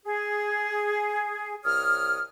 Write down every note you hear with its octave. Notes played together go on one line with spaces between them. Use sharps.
G#4
C2 C#5 D#6 F6